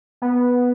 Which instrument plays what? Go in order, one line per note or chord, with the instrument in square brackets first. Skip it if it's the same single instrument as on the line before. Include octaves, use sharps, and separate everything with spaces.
[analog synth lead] B3